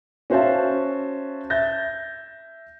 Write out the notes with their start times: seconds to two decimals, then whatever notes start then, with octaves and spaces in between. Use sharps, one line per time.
0.30 C#4 F#4 C5 E5 F5 A5
1.50 E5 G6 A6 A#6